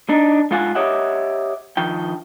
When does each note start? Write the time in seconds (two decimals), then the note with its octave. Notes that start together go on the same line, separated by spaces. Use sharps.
0.09 D4 D#4
0.51 G#2 F4 F#5 G#5
0.75 G4 C#5 D#5 E5 F#5
1.77 D#3 F3 G5